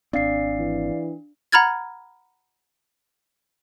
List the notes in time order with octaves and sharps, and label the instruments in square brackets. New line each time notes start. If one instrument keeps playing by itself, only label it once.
[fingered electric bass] G#1 C4 [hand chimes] D4 [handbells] D5 F5 C7
[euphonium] E3
[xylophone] F#5 A#5 B5 F6 G#6 A6